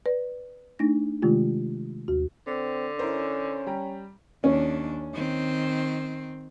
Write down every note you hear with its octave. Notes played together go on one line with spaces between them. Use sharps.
B4 D5
A3 D4 D#4 A#6
C3 D#3 G#3 A3 F4 G4
D#2 F#4
D3 C4
C#4 E4 A#4 C5
G3 G4 A#5
D#2 C#4 D4
D#3 C4